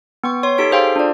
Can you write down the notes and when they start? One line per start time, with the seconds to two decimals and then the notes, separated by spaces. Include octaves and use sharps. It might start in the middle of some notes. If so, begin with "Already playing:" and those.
0.24 B3 G5 C#6
0.43 C#5 C6
0.58 D#4 G4 A4 B6 D7
0.71 G#4 A4 C5 F5 G5 C6
0.96 D4 F4 D5